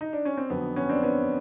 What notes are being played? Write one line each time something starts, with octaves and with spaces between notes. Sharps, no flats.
D#4
D4
C#4
C4
F2 D3 F#3 B3
B3 C#4
C4 D4
B3 C#4